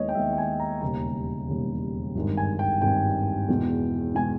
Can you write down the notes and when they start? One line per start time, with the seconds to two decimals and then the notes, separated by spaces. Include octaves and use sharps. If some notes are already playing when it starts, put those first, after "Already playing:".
Already playing: D#2 D#3 G#3 B3 C#5 D#5
0.09 G5
0.15 D#2 D#3 G#3 B3 E5
0.33 G5
0.38 G#5
0.60 A#5
0.81 E1 D#2 C#3 G3 A#5
1.49 E1 D#2 C#3 G3
2.15 G#1 G2 D#3 G#3
2.37 G#5
2.59 G5
2.82 G#1 G2 D#3 G#3 G5
3.48 E2 B2 G#3
4.15 B2 G#3 G#5